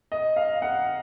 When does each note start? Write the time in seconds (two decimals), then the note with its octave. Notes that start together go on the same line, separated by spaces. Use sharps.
0.12 D#5
0.36 F5
0.62 F#5